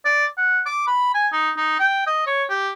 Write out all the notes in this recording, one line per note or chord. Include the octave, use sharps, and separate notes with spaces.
D5
F#5
D6
B5
G#5
D#4
D#4
G5
D#5
C#5
G4